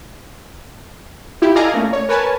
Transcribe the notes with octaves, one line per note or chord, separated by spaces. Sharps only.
E4 F4 G4
A4 D5 D#5 F5 G#5 A#5
A3 A#3 C#4
C#5
A#4 B4 C#5 G#5 A5